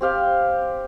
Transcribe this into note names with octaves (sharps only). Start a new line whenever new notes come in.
C4 G4 F5 G5